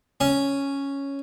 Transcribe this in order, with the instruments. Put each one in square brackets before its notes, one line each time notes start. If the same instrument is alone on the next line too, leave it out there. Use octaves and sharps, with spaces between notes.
[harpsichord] C#4